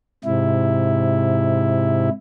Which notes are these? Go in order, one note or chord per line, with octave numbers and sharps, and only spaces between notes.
G#2 C3 E4